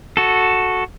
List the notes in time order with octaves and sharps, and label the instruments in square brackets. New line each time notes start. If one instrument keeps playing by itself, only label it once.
[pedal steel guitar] F#4 A4